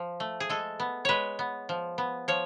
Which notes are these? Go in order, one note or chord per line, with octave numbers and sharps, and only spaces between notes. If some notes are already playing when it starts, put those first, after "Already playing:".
Already playing: F3
A3
G#4
G#3 A4
B3
G#3 B4 C#5
B3
F3
B3
F3 C#5